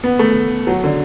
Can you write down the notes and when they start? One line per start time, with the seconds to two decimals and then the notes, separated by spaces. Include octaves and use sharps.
0.04 B3
0.19 A3
0.67 F#3
0.84 D3